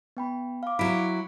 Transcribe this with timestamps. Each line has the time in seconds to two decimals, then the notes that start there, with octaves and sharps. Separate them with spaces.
0.17 B3 G5 B5
0.63 F5 D6
0.79 F#3 E4 B5 B6 D7